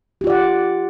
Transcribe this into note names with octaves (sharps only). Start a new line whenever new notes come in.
F4 G4 D5 F#5